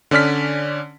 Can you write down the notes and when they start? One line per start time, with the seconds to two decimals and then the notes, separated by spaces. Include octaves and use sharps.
0.11 D3 C#4 D5 F6 B6